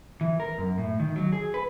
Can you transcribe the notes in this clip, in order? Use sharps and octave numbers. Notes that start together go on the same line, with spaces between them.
E3
A#4
F#2
A2
D#3
F#3
G#4
B4